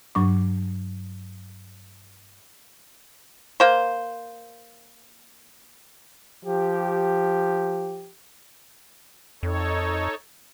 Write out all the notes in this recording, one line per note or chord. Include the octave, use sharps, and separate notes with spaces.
G2 F#3 D4 C#6 D6
A#3 C5
F3 G4
F2 D#4 A4 C#5